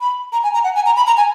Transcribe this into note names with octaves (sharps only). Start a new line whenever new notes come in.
B5
A#5
G#5
A#5
F#5
G#5
A#5
B5
A#5
G#5